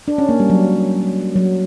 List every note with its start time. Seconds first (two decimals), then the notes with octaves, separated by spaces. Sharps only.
0.08 D4
0.18 C#4
0.29 A#3
0.40 G3
0.50 F#3
1.36 F#3